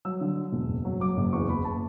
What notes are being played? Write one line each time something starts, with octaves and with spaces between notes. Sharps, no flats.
F#3 E6
D3
F#3
E1
F#1
F#3
F#3 D6
F#1
E2 C#6
F#1 B5
A5